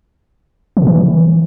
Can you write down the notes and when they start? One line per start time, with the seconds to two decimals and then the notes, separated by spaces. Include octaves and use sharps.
0.77 E3
0.82 B2
0.87 E3